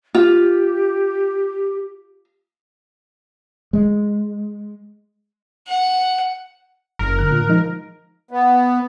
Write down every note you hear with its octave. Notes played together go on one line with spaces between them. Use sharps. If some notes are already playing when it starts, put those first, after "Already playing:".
F4 G4
G#3
F#5
F#1 A#4
D3 F#6
A#2
F3 G#3 D#4
B3